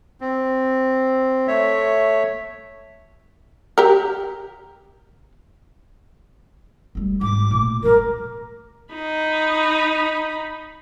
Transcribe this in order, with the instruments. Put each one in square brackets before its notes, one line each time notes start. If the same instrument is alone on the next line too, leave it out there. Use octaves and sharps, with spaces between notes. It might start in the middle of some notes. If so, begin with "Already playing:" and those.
[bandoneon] C4
A3 C#5 E5
[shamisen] G4 A#4
[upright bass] D2 G3
[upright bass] G#1 [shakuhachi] D6
[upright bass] A#2 A3
[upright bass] F3 F#3 [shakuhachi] A#4
[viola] D#4 B5